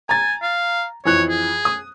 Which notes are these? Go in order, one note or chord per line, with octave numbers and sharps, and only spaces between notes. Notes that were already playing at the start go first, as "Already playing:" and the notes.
G#5 A#5 A6
F5
F2 E3 C#5 F#6
G#4
D#6